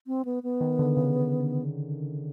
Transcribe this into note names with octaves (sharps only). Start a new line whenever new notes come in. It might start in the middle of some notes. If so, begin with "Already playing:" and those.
C4
B3
B3
D#3
D3
C#3